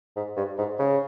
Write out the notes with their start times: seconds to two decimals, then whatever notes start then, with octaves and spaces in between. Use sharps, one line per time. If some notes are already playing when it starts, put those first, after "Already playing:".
0.17 G#2
0.37 G2
0.58 G#2
0.79 C#3